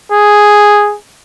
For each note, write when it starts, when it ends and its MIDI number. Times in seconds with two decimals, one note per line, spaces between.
0.12 0.96 68